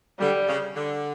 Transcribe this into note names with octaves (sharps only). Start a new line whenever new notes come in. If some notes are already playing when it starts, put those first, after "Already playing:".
D3 G3
C#3
D3